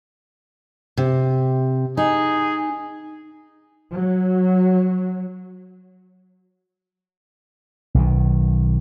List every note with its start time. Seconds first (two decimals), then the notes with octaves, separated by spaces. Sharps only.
0.97 C3
1.97 D#4 G#4
3.93 F#3
7.94 B1 D#3